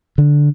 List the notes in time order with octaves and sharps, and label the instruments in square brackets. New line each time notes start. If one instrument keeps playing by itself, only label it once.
[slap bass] D3